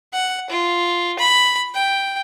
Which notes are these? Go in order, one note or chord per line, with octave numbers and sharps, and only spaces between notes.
F#5
F4
B5
G5